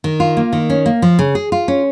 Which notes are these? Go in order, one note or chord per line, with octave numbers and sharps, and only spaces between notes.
D#3
F4
A#3
D#3
C#4
A#3
F3
C#3
G#4
F4
C#4